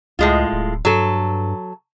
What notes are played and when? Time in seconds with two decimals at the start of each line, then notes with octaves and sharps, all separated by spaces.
0.19 C#2 A2 G#3 F4
0.52 D1
0.85 G2 F#3 A4